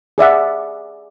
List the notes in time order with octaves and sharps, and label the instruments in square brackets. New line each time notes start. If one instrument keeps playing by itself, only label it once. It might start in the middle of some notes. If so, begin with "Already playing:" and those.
[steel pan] G#4 D5 E5 F#5